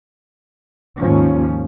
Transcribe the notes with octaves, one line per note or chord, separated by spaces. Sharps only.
D#2 G#2 F3 C#4